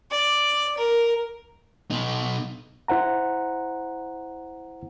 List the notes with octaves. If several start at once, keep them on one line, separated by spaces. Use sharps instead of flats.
D5
A#4
B2 D#4
E4 C5 F#5 A#5